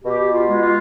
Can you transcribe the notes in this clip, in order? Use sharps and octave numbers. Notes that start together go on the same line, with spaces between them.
B2 G4
F4
G#3
F4